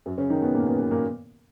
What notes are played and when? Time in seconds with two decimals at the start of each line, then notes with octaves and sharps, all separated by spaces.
0.06 F#2 F#3
0.18 C#3 C#4
0.30 D#3 D#4
0.42 B2 B3
0.54 A#2 A#3
0.66 B2 B3
0.78 B2 B3
0.91 A#2 A#3